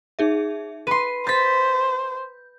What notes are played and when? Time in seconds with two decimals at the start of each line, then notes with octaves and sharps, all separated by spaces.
0.19 D#4 G#4 E5
0.87 B4 C6 D#7
1.27 C5 G6 A6 B6